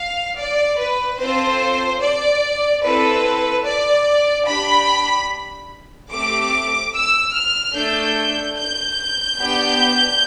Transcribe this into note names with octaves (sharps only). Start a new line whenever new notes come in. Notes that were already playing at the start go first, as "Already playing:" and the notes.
Already playing: F5
D5
B4
C4 F4 A4 C5
D5
C4 E4 A4 B4
D5
D4 G4 B5
A3 C4 G4 D6
E6
F6
A3 D4 A4 G6
G6
B3 D4 G4